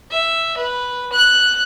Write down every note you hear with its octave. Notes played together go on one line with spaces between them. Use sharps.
E5
B4
F#6